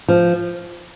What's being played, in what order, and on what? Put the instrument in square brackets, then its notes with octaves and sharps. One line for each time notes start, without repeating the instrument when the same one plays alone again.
[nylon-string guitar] F3